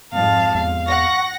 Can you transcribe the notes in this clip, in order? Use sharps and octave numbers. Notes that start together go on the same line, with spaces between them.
F2 G#2 F5 A5
E2 F5
F#5 C#6 A#6